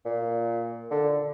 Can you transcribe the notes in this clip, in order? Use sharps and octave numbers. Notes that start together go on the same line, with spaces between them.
A#2
D3